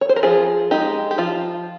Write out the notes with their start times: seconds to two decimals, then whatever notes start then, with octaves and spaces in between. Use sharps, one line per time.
0.01 C#5
0.09 C5
0.16 A#4
0.23 F3 F4 G#4
0.71 G#3 D#4 G4
1.11 G4
1.18 F3 F4